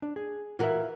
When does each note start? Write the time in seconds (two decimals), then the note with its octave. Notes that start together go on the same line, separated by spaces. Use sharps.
0.02 D4
0.16 G#4
0.59 E3 F4 F#4 A#4 E5